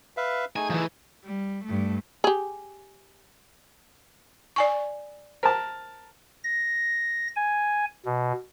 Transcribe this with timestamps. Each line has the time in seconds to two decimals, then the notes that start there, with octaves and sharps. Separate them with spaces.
0.17 B4 E5 F5
0.56 A3 D#4 G#4 G#5
0.70 E3 F3
1.24 G3
1.65 G2 A3
2.24 G4 G#4
4.56 D5 G#5 C#6
5.43 A#4 C5 A5
6.44 A#6
7.36 G#5
8.05 B2